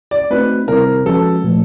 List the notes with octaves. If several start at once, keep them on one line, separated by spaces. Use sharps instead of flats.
D5
A3 C4 D#4 F#4 B4
C3 D#3 G3 C4 E4 A#4
F3 G#3 C#4 F#4 A4 B4
A#2 F3 A3